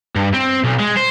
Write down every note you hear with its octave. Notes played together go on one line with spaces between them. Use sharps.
G2
C4
B1
G#3
C5